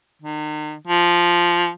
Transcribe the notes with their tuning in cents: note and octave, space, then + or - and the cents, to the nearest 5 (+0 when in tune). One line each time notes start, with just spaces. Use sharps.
D#3 -40
F3 -5